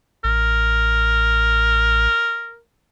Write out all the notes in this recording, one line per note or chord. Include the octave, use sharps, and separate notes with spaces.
A1 A#4